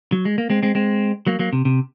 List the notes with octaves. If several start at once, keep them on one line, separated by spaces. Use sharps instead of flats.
F#3
G#3
A#3
G#3 C4
G#3 C4
G#3 C4
F#3 A#3
F#3 A#3
C3
C3